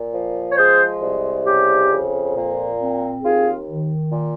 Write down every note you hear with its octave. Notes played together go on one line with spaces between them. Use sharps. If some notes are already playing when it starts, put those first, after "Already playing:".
Already playing: A#2
F3
C#5
G#3 G#4 C5
C2
C#3 G4
F2
A#2
C4
D#2 F4 G#4
D#3
A#2